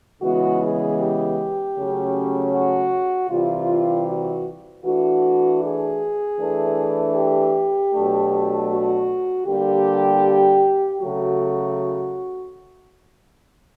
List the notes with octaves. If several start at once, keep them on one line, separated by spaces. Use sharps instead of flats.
C#3 E3 G#3 B3 F#4
G#4
G4
C#3 F#3 A3 C#4
F#4
C3 E3 G3 F4
F#4
E3 A3 D4 F#4
G#4
E3 A3 D4
G4
B2 F#3 A3 D4
F#4
D3 G3 A#3 G4
C#3 F#3 A3 F#4